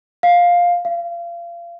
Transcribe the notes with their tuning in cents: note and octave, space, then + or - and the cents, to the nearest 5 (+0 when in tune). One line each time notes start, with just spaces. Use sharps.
F5 +10
F5 -30